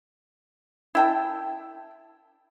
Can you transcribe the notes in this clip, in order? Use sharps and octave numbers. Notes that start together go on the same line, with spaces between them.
E4 G5 A5